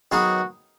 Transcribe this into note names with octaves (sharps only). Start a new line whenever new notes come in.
D#3 F#3 B3 D#4 F#4 G#4